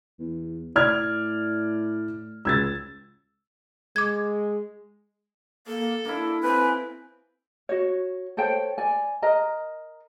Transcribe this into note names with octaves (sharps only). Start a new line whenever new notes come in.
E2
A2 D5 F6 G#6
C#2 E6 G#6 A6
G#3 D6 G#6
A#3 A4
A#3 D4 E4
C4 B4 G#5
F#4 C#5
A4 C5 C#5 G5
D5 G#5
A#4 D#5 A#5